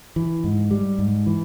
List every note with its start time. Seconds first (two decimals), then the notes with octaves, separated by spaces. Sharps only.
0.16 E3
0.44 G#2
0.71 G3
0.99 G#2
1.26 E3